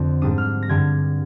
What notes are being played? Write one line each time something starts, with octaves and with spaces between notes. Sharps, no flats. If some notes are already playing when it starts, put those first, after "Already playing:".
Already playing: F2 D3 C4
G#2 G3 D4 D#6
F6
A#6
G2 D3 G3 G#6